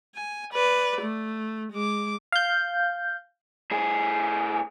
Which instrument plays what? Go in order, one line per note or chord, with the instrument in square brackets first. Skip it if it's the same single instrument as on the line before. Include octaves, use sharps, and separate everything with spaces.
[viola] G#5
B4 D5
A3
G#3 D6
[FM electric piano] F5 G6
[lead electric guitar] A2 G#4